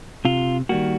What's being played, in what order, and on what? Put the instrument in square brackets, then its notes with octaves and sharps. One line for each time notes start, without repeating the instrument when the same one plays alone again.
[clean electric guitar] C3 F4
D#3 G3 A#3 F#4